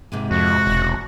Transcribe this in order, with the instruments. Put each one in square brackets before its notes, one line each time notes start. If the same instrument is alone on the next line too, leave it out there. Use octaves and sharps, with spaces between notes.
[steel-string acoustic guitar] G#2 C3 G#3
[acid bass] F2 [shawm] F#4
[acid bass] E1